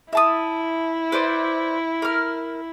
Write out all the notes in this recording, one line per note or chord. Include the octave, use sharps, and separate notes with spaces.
E4 E5 A5 D#6
B4 C5 D5
A#4 F6